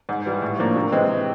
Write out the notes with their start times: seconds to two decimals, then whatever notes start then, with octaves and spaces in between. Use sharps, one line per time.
0.09 G#2
0.26 E3 G3
0.42 A2
0.59 F3 A#3 D4
0.76 C3
0.92 E3 G#3 C4